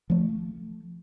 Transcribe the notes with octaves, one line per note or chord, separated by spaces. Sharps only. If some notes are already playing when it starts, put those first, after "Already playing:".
F3 A3